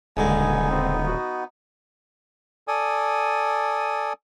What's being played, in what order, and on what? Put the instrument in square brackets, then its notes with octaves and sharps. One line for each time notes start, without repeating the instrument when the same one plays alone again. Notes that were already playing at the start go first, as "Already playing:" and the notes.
[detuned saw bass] D#1 [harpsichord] C#2 D3 G#3 [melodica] B3 D#4 [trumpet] G#5
[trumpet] C4
F#4
[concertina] A4 D5 G#5 D#6